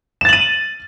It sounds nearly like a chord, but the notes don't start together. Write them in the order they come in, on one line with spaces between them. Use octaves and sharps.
E7 A6 F#7 D#7